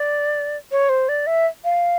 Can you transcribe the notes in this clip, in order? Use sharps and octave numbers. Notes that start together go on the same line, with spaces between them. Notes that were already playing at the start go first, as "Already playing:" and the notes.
Already playing: D5
C#5
C5
D5
E5
F5